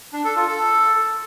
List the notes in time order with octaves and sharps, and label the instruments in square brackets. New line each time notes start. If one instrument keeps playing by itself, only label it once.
[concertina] D4
A4
F4
A4